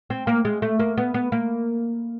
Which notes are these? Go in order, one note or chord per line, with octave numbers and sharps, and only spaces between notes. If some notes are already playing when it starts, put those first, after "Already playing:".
C4
A#3
G#3
A3
A#3
B3
B3
A#3